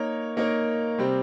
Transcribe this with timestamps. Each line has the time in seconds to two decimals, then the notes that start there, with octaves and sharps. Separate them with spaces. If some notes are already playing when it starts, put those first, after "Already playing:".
Already playing: A#3 D#4 A#4 C#5
0.37 A#3 D#4 A#4 C#5
0.98 C3 G3 C4